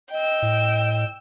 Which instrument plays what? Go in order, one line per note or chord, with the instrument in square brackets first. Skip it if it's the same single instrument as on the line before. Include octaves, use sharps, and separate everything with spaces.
[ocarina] D#5 [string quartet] G5 E6
[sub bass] A2